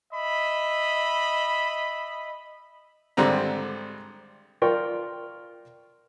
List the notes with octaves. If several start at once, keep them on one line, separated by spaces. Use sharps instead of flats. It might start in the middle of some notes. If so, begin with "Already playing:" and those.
D#5 E5 B5
G#1 D3 G3 C4 A#5
F4 A#4 D5 G5 C#6